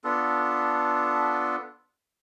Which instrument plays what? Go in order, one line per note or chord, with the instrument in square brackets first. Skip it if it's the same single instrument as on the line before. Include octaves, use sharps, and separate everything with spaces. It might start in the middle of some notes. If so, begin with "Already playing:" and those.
[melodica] B3 D4 F4 A4